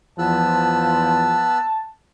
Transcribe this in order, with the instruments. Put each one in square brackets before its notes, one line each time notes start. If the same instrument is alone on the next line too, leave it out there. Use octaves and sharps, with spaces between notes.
[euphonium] E2 [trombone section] F3 [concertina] B3 E6 F#6 [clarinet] A5